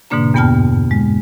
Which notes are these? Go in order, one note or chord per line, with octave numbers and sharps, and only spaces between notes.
G#2 B2 D3 A#3 D4 A#5
E2 G2 B3 G5 A5 F6
G#3